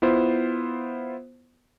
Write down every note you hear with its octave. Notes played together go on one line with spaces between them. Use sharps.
B3 E4 F4 C5